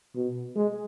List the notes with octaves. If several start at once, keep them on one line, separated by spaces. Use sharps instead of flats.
B2
G#3